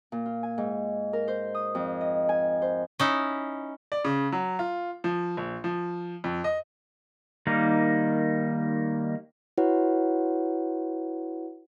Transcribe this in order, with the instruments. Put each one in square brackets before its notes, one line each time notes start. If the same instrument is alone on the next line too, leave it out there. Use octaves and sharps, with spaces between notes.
[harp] A#2
F4
G#5
G#2
A#4
C5
D#6
F2
D#5
G#5
C5
[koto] C#4 D#4 E4
[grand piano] D5
C#3
F#3
F4
F3
A#1
F3
F2
D#5
[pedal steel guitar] D#3 G3 A#3 D#4
[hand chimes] E4 F#4 B4 C#5 F#5